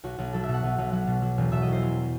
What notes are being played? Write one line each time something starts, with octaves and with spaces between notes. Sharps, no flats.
B1 F#4
B1
F#3 A4
E5
B2
F#5
B1
B1
F#3 F#5
B2
F#3
E1
B2 E5
D#5
E2
C5
F#3